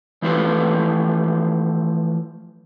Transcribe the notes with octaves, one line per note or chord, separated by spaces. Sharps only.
E3 F3 A3 F4 G4 B4